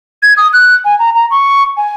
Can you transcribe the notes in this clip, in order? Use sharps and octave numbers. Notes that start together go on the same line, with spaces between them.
G#6
D#6
F#6
G#5
A#5
A#5
C#6
G#5